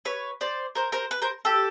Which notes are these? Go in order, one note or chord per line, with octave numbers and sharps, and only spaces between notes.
B4 C#5
C5 D5
A#4 C5
A#4 C5
B4
A#4 C5
G4 A4